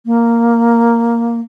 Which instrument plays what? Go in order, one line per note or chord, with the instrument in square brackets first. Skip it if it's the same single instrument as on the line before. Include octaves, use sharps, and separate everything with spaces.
[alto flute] A#3